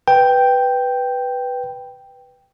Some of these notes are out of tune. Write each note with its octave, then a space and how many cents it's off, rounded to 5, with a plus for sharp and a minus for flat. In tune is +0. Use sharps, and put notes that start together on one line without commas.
B4 +0 G5 +0